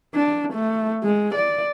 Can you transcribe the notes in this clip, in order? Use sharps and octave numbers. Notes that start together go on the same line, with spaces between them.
D4
A3
G#3
D5